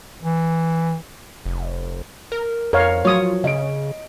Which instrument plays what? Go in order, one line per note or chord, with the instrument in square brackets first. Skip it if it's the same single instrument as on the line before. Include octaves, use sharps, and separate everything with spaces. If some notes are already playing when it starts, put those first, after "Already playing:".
[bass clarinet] E3
[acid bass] F1
A#4
[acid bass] F2 [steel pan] A#4 C#5 F5
[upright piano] F3 F#3 [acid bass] F4 [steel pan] C#5 D#6
[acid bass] C#3 [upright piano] D#5 D7